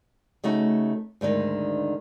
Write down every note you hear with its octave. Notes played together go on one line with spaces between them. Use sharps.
C#3 A3 D#4 F#4 A4
D2 G#2 D3 D#3